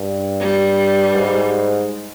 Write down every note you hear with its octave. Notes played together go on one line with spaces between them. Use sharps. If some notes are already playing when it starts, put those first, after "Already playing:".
Already playing: G2
G3
G#2